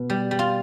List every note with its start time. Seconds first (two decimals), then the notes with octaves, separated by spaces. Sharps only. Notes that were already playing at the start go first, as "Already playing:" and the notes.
Already playing: B2
0.10 G3
0.31 G3
0.39 F4